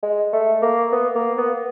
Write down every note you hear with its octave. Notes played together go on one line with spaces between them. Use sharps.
G#3
A3
A#3
B3
A#3
B3